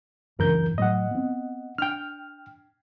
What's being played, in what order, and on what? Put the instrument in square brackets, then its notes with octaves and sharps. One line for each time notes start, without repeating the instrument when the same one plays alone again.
[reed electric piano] C#2 A#4 G6 [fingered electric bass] F#2 E3 D4
[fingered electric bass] A2 F#3 [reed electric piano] D#5 F#5
[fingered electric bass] B3 C4
[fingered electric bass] D4 [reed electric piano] G5 F6